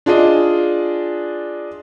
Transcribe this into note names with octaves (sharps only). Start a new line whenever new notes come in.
D4 F4 G#4 D5 D#5